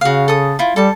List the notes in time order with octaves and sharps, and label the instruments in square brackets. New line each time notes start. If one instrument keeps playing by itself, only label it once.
[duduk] C#3 [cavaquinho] F#4 F5
[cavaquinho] A4 D#6
E4 F4
[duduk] G3 [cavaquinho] A4 A5